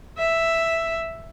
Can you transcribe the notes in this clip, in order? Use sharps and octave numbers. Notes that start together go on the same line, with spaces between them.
E5